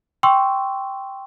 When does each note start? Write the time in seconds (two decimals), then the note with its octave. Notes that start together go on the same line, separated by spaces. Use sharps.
0.23 G5 C6 C#6 E6